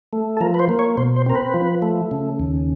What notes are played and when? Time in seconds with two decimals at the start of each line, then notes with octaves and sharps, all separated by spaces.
0.13 A3
0.37 A4
0.41 F3 A#4
0.54 B4
0.59 C5
0.69 A#3
0.79 C#5
0.97 B2 C5
1.16 C5
1.26 C4 A#4
1.35 B4
1.54 F3
1.82 A3
2.11 C#3
2.39 D#2